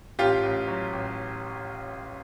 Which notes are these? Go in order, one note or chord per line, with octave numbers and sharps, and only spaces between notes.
A1 F4 G4
A1
F#3
A1